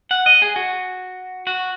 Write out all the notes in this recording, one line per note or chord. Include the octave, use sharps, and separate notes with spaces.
F#5
D#5
G#4
F#4
F#4